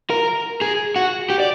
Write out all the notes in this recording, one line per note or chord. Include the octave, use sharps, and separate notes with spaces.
A#4
G#4
F#4
G4
D5